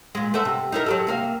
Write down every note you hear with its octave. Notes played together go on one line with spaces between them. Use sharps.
A#2 G#3
A3 B3 E5
C3
D#4 E4 A#4
F#3 G4 A4
C3 A#3 F5